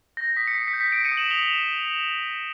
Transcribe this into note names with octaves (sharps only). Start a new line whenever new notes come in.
G6 A#6
D#6 B6
C#7
D#6 C7
B6 C#7
G6
B6 C#7
G6 C7 D7
C#7 D#7
D#6
E7 F#7
D#6 F7 G7